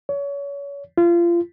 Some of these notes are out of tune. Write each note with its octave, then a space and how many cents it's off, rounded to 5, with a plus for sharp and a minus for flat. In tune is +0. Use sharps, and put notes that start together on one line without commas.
C#5 +30
F4 -30